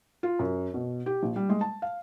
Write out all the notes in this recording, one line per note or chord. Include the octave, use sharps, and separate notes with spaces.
F4
F#2
B2
G4
A#1
G3
G#3
A5
F5